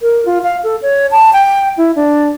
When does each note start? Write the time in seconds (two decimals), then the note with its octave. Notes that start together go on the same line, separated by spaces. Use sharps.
0.01 A#4
0.25 F4
0.43 F5
0.64 A4
0.82 C#5
1.11 A5
1.33 G5
1.77 E4
1.96 D4